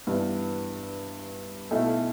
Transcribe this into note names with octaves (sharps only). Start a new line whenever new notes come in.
G2 E3 B3 E4
B1 B2 A3 E4 A4